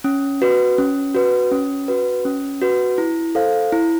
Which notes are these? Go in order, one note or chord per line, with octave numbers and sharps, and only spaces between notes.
C#4
F#4 B4
C#4
F#4 B4
C#4
F#4 B4
C#4
F#4 B4
E4
A4 C5 F5
E4